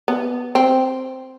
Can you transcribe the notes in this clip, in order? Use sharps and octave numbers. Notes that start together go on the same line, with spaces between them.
B3
C4